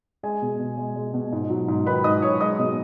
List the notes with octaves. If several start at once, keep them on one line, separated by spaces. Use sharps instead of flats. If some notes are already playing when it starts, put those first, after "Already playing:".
G#3 G#4 G#5
B2
B2
G#3
G#3
B2
G#2
F#3
G#2
D#3 B4 B5
G#2 D#5 D#6
F#3 C#5 C#6
G#3 D#5 D#6
B2